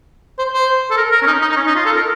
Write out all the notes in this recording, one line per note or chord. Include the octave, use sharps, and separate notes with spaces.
C5
C5
A4
A#4
A#4
C#4
D#4
D#4
D#4
C#4
D#4
F4
A4
A#4